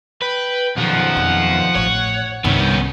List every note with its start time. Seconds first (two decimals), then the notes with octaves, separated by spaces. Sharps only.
0.22 B4 G5
0.78 B2 D#3 F3 F#5
1.17 F2
1.75 A1 C#5
2.44 C2 G2 D#3 B3 C#4 E4